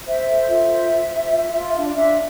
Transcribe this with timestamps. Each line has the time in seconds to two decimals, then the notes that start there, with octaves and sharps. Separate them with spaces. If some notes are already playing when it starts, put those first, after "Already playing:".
0.07 C5 E5
0.28 A4
0.49 F4 E5
0.70 C5
0.91 C5
1.12 C5
1.33 F4
1.54 F4
1.75 D4 E5
1.84 D5
1.95 D4 E5